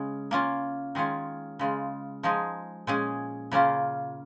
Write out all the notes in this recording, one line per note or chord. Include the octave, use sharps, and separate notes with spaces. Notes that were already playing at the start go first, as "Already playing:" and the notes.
Already playing: C#3 G#3 C#4
A#3 C#4 F4
D#3 G#3 C#4 F4 C#5
C#3 G#3 F4
F3 G#3 D#4 G#4
A#2 G#3 C#4 G#4
C#3 A#3 C#4 F4